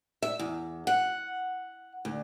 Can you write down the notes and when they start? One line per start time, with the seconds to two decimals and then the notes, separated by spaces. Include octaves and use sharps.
0.22 E5
0.40 E2
0.87 F#5
2.05 D2